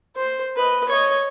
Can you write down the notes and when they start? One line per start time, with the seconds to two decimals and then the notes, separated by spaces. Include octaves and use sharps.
0.16 C5
0.56 B4 D#5
0.89 C#5 D#5